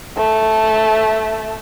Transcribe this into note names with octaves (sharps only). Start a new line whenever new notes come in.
A3 A5